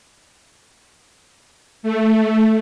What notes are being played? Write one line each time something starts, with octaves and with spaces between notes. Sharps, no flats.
A3